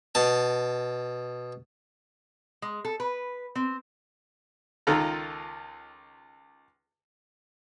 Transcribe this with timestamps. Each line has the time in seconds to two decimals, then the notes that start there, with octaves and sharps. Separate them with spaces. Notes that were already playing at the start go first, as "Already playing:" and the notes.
0.15 B2 A5
2.62 G#3
2.85 A4
3.00 B4
3.55 C4
4.87 C#2 D#3 F4 A4 A#5